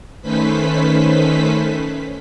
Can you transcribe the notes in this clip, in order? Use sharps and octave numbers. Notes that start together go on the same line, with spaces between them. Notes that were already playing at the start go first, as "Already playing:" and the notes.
D#3 A3 C#4 B4 C5 B6